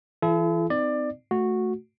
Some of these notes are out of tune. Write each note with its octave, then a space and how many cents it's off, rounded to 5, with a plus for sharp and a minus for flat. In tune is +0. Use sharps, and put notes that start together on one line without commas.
E3 +10 E4 +45 A4 -40
C4 -40 D#4 +0 D5 +20
A3 +0 F#4 -10